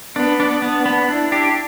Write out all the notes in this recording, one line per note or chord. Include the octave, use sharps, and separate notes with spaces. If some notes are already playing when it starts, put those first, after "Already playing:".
B3 D4
D4
B3 D4
B3
D4 E4
D4 G4